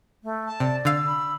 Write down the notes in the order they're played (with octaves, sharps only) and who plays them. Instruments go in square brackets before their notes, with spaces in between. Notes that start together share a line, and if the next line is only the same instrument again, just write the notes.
[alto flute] A3
[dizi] A5
[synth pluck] C3 [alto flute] D5
[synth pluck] D3 F5 [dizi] E6
[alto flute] B5